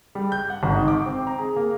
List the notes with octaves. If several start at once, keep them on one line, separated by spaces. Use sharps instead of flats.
G3
G6
F#5
G#1
D#4
D6
C4
A#5
G#4
A#3